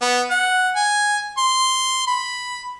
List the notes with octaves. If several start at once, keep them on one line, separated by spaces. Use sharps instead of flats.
B3
F#5
G#5
C6
B5